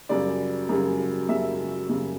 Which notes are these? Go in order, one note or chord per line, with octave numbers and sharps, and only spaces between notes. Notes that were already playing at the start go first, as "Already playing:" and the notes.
F#2 C#3 G3 D5
F#2 C#3 G3
F#2 C#3 G3 E5
F#2 C#3 G3